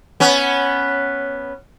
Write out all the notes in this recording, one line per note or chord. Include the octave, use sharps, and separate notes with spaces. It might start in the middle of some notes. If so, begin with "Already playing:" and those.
B3 C#4